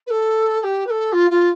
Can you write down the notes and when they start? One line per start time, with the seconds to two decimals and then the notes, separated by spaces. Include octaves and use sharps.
0.07 B4
0.10 A4
0.60 A4
0.63 G4
0.86 B4
0.90 A4
1.12 F4
1.30 F4